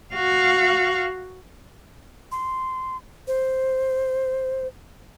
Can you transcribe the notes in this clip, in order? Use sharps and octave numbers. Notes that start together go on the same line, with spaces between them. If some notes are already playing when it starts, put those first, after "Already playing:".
F#4 F5
C6
C5